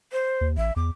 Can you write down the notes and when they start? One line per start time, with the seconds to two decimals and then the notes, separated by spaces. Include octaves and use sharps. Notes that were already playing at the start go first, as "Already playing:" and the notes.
0.12 C5
0.41 D#2
0.57 A1 E5
0.76 E2 D6